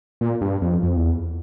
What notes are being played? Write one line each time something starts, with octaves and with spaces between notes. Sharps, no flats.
A#2
G2
F2
F2
E2